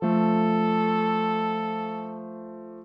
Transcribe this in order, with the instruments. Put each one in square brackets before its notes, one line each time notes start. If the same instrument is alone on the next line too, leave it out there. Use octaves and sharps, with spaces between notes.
[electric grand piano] F3 A3 [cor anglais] A4